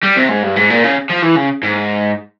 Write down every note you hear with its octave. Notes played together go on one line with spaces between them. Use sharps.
G3
C3
G#2
G2
G#2
A#2
C#3
F3
E3
C#3
G#2